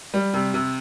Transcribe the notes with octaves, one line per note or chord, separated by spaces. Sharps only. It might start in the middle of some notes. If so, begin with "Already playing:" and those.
G3
C3
C3